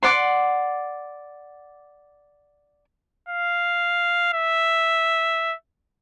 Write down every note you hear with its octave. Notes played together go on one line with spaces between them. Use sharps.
D5 F#5 C6
F5
E5